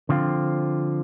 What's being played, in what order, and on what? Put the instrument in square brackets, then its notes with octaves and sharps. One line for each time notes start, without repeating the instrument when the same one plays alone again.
[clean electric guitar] D3 F3 C4 F4